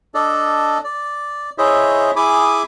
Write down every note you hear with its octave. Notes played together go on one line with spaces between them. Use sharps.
D4 A4 D5 D#5
D5
E4 G#4 C5 C#5 D#5 E5
E4 G#4 G#5 B5 D6 D#6